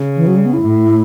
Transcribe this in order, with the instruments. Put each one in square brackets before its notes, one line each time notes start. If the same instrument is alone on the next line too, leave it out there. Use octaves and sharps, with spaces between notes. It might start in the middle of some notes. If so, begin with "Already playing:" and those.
Already playing: [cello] C#3
[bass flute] E3
F#3
G3
B3
E4
[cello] A2